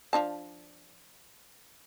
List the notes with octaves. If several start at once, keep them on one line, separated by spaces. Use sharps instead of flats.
F3 D4 A5